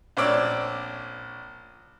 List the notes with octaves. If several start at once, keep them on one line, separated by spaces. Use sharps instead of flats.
A#1 C4 C#4 D5 D6 E6